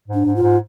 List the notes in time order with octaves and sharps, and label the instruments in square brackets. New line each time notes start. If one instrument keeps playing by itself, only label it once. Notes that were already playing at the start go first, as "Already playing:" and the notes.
[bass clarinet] G#2
[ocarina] D4
[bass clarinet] G#2
[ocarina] F4
[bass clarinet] G#2